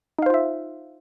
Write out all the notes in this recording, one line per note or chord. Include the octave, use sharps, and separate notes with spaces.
D#4 F4 C5 E5 F5